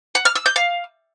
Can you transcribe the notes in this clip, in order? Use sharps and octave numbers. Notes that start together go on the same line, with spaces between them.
F#5
F6
E6
G6
F5